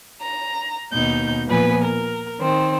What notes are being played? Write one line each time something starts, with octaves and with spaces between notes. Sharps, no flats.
A#5
D#2 B2 D#4 G6
A#2 F3 B3 B4 G#5
A#4
D#3 C4